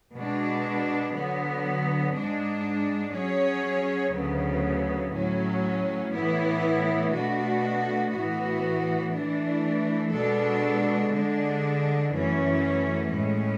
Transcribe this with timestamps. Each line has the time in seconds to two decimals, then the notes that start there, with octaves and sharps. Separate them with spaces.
0.13 B2 G#3 D4
1.13 D3 F#3 B3
2.13 G#2 G#3 D4
3.12 F#3 C#4 G#4 C#5
4.12 D2 C#3 F#3 B3
5.12 A2 F#3 C#4
6.11 A2 E3 B3 E4
7.11 B2 A3 D4 F#4
8.11 A2 E3 B3 F#4
9.10 E3 A3 D4
10.10 B2 G#3 D4 A4
11.10 D3 G#3 D4
12.10 F#2 E3 A3 C#4
13.09 A2 G#3 C#4